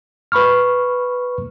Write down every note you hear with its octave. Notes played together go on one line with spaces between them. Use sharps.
B4 B5 C#6 F6